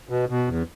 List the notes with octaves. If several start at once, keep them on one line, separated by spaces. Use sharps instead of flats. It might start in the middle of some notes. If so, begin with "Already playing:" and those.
B2
B2
E2